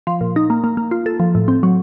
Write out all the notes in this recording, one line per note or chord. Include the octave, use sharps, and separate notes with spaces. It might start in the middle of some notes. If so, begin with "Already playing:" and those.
F3
A#2
D#4
A#3
A#3
A#3
F4
A4
F3
A2
C4
F#3